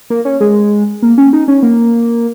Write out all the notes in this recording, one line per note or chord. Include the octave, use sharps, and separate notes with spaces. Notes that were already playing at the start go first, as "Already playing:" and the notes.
A#3
C#4
G#3
A#3
C#4
D#4
C#4
A#3